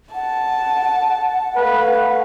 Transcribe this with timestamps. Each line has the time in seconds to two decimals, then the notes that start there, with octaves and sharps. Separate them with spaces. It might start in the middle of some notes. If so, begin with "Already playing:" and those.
0.14 F#5 A5
1.56 A3 B4 F5